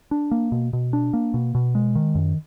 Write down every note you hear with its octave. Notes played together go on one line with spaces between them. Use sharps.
D4
A#3
B2
B2
D4
A#3
B2
B2
G#3
D#3
F#2